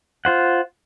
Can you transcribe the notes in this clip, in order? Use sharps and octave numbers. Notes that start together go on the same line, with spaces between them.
F4 C5 F#5